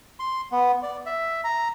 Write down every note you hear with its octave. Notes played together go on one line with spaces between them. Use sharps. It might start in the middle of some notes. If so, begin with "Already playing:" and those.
C6
B3
D5
E5
A#5